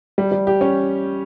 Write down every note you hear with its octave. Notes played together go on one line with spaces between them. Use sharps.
G3
G3
G4
C#4